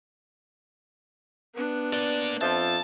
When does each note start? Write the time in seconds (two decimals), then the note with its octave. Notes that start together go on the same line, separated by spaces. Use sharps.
1.54 B3 D4
1.93 A#3 D5
2.41 F2 F3 E5 A5